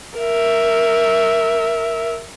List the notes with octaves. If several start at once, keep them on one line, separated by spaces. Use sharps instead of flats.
A#4 E5